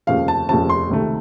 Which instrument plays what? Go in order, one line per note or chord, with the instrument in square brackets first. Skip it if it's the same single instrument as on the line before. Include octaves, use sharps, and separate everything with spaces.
[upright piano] F1 D#2 C#3 F3 F5
A5
F1 D#2 C#3 F3 A5
C6
C#2 C3 D#3 A3